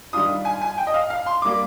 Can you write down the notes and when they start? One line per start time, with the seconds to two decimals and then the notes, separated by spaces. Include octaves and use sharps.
0.13 D#3 G3 D4 F4 D#6
0.45 G#5
0.62 G#5
0.78 G5
0.87 D#5
0.94 F5
1.10 F5
1.26 C6
1.42 G3 A#3 D6